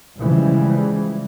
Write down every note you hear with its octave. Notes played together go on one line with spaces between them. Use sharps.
C#3 E3 F3 G3 G#3